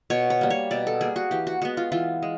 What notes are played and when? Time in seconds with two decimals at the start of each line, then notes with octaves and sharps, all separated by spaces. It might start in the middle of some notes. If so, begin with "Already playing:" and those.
0.10 B2 C#5
0.30 C#5
0.41 G3 A#3
0.50 C#5
0.71 B2 D5
0.87 A4
1.01 G3 A#3 G#4
1.16 F#4
1.31 E3 G4
1.47 F#4
1.62 G#3 B3 F#4
1.77 F4
1.92 E3 F4
2.23 G#3